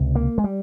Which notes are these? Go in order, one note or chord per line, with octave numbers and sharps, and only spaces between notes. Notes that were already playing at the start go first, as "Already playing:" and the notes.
Already playing: C#2 C3
A#3
G#3
G3